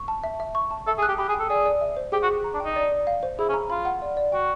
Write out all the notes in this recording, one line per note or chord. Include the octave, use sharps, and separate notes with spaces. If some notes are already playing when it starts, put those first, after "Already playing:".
Already playing: C#6
A5
E5
E5
C#6
A5
A4 E5
G#4
F#6
G4
G4 B5
G#4
G5
A4
G#4 D5
D5
E5
C5
G4 G#4
F#4
G#4
A#5
D4
D#4 G5
D5
D5
F5
C5
E4 G#4
C#4
A#5
F4 B5
F#5
D5
D5
F#4 G5